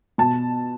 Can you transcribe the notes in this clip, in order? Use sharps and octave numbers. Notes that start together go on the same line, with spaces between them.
B2 A5